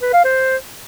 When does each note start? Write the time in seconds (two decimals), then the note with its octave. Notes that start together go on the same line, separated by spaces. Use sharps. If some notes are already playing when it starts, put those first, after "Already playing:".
0.02 B4
0.13 F5
0.25 C5